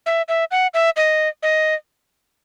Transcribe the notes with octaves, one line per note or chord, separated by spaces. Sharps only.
E5
E5
F#5
E5
D#5
D#5